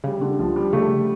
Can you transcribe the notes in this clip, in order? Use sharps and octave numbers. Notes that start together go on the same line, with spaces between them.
C#3 G3
D3
C#2 F3
G3
C#3 A3